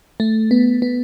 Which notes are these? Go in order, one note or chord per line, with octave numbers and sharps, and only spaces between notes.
A3
B3
B3